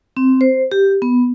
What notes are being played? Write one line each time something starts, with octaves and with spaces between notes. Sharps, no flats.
C4
C5
G4
B3